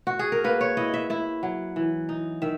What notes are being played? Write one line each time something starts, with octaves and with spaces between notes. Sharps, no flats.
F#4
G#4
A#4
A#3 B4
C#5
E4 D#5
E5
E4 E5
F#3
E3
D#4
D#3 E5